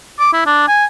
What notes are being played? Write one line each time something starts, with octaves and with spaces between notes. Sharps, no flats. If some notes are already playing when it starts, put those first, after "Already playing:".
D6
E4
D4
G#5